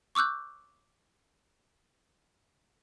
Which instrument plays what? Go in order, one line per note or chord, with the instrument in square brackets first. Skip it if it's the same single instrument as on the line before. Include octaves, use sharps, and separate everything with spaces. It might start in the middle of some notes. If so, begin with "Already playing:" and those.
[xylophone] C#6 D6 E6 F#6 G6